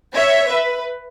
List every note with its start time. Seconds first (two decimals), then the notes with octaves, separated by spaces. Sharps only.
0.14 C#5 E5
0.50 B4